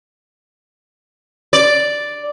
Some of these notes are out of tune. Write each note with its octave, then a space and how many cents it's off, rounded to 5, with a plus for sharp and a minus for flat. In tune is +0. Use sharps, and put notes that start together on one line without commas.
D5 +0